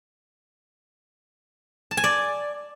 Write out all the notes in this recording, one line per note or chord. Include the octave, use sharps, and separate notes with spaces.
A5
G#5
D5